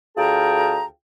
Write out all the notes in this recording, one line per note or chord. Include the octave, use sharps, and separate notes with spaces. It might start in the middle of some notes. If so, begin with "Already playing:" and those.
D2 F4 G#4 G5 A5 A#5